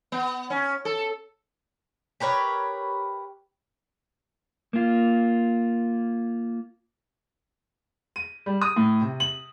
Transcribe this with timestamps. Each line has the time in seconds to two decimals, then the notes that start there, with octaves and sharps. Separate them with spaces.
0.12 B3
0.50 C#4
0.85 A4
2.20 G4 A#4 B4 C#5
4.73 A#3 F4
8.16 D#7
8.46 G3
8.62 D#6
8.76 A2
9.01 C3
9.20 F#7